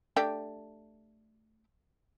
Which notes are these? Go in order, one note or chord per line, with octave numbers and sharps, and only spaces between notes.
A3 D4 G4